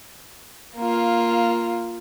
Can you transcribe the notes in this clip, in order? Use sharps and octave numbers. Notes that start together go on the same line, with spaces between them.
A#3 F4